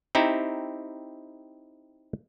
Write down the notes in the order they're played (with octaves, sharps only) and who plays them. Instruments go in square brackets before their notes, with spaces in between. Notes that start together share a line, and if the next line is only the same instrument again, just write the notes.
[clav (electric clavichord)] C4 D#4 E4 G4 A#5